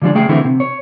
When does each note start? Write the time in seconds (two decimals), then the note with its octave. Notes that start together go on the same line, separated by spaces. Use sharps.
0.02 D3 F3 G3 G#3 D4
0.15 C#3 A3 G#4 G5
0.29 D3 E3 A3 C4 E4
0.45 C3
0.60 C#5